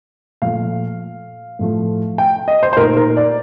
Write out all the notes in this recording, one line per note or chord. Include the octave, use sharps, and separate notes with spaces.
A#2 F3 A3 F5
A2 F3 A3
G5
D#5
C5
C5
A#2 A3 D#4 A#4
A#4
D5